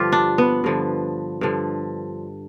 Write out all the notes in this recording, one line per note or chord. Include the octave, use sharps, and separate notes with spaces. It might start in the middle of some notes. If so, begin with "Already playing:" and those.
Already playing: G2 D3 F3 F4 G4
D4
B3
G2 D3 F3
G2 D3 F3